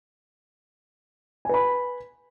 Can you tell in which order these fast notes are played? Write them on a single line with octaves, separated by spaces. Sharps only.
G#5 B4 B5